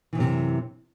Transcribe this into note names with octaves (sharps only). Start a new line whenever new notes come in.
F#2 C3 D#3 E3